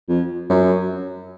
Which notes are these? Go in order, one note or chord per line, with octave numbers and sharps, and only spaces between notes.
F2
F#2